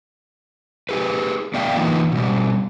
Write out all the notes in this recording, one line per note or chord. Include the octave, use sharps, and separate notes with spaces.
G4 G#4 B4
B3 D5 E5 F5 G5
E3 A3 A#3 D#4 F4 B4
B2 G3